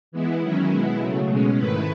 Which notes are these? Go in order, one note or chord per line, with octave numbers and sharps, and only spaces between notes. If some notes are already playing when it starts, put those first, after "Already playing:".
E3 G#3 B3 E4
D#3 F#3 C#4 E4
B2 G#3 B3 E4
C#3 F#3 A3
B2 G#3 C#4
G#2 D#3 A3 E4 B4